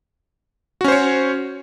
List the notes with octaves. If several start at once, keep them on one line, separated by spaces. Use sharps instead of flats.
C#4 F#4 C5 C#5